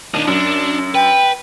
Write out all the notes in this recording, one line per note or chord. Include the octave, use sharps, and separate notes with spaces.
D#2 D4 D#4
F#2 D4
B4 G5